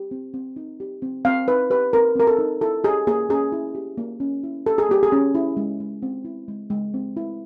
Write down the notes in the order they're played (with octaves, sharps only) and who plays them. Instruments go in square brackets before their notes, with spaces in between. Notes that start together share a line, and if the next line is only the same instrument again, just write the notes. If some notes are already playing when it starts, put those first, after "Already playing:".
Already playing: [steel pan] G4
C4
C4
D#4
G4
C4
C4 F5
D#4 B4
G4 B4
C4 A#4
C4 A#4
A4
D#4
E4 A4
G4 G#4
A#3 G#4
C#4 G#4
E4
G4
A#3
C#4
E4
G4 A4
G#4
A#3 G4
G#4
C#4
E4
G#3
G#3
C4
E4
G#3
G#3
C4
E4